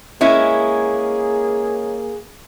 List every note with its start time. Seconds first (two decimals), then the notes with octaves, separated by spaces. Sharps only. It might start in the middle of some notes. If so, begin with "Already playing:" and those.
0.21 G#3 A#3 C#4 E4 G#4